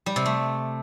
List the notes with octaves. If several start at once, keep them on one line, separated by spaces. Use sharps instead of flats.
G3
C3
A3